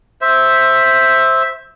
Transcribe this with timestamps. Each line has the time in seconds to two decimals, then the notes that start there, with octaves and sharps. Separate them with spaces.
0.21 C5 E5